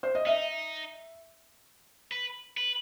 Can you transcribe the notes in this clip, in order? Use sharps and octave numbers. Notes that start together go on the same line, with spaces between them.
C5
D#5
D#4 E5
B4
B4